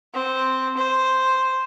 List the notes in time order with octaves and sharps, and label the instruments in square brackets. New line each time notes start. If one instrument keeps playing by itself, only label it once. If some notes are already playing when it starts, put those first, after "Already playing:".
[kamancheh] C4
C5